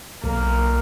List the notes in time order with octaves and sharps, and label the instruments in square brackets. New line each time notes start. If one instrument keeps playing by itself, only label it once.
[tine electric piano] B1 [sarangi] A#3